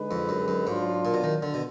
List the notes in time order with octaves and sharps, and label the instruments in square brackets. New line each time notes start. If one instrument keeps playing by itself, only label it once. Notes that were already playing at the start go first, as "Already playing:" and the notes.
Already playing: [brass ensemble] D3 G#3 D#4 G#4 B4
[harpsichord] F2
F#2
F#2
[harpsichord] G#2 [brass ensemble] F#3 D4 F4
[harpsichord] A#2
B2
D#3
D3
B2